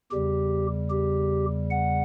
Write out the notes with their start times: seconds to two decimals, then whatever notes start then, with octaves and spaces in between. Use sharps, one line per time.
0.12 E2 C#3 G3 G4
0.90 G4
1.70 F#5